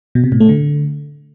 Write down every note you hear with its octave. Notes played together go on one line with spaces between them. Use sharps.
B2
C3
A2
A3
D3